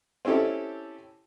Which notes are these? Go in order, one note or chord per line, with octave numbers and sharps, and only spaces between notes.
C4 C#4 E4 G4 A4